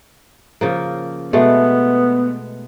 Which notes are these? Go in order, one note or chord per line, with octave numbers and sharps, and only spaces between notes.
C#3 F3 A#3
B2 G#3 A3 B3